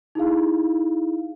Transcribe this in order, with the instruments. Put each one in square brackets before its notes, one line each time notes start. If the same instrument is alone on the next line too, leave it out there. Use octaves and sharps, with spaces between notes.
[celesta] D#4 E4 G#4 F5